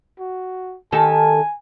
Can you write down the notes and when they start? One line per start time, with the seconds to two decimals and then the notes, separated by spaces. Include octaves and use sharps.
0.19 F#4
0.92 D#3 G4 A4 G#5